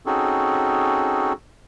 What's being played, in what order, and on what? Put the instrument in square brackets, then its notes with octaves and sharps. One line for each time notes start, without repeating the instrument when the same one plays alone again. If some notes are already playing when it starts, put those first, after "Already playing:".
[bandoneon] C4 C#4 D#4 F#4 G#4 A4